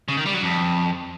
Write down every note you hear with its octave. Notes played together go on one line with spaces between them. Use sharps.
C#3
D#3
G3
F#3
F2